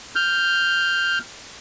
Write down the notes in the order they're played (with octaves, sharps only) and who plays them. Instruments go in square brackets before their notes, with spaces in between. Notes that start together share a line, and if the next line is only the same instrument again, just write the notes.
[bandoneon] F6 G6